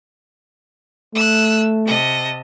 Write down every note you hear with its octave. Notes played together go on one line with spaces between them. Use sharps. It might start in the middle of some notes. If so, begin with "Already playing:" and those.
A3 E6 F#6
C3 D#5 A5